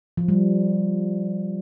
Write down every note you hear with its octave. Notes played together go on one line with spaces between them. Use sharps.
F3
G3